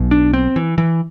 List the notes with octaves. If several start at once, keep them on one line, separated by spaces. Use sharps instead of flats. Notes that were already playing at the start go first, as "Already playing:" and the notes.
Already playing: B1 B2
D4
C4
E3
E3